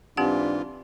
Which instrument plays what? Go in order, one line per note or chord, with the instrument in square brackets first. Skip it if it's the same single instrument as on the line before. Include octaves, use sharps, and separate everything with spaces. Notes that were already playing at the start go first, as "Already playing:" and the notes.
[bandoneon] G#2 E3 F4 [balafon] C4 G4 F#5 [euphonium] D4